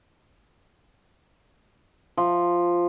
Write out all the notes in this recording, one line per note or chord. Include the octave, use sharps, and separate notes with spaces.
F3